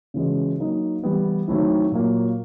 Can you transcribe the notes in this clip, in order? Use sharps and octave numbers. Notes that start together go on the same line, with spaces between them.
C#3 E3 G#3 C#4 F#4
F#3 A#3 D#4
E3 G3 B3 E4
D#3 F#3 A3 C4 E4
A#2 F#3 A#3